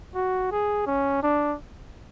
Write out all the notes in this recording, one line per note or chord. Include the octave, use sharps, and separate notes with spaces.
F#4
G#4
C#4
D4